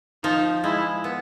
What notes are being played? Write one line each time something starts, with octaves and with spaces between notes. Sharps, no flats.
F3 D#4
G#3 E4
B3